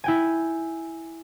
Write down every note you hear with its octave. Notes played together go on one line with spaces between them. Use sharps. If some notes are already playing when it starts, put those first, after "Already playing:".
E4 G5 G#5